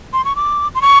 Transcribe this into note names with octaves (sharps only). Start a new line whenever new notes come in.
C6
C#6
D6
C6
C#6